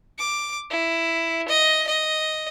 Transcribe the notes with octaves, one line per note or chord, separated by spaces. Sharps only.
D6
E4
D#5
D#5